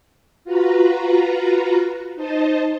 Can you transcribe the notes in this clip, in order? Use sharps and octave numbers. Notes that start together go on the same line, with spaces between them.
F4 F#4 B4 A#5
D#4 C5 D#5 A5